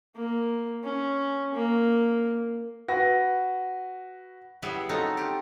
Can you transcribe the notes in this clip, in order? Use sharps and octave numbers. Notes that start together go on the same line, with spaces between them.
A#3
C#4
A#3
F#4 B4 A#6
G3 B3 E4 G#4 C#5 E5
C4 C#4 D#4 F4 F#4 A4
F4 G4